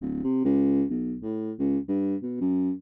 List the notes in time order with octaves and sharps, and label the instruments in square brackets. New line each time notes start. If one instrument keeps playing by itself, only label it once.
[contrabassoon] D1
C3
C#2
B1
A2
C#2
G2
B2
F#2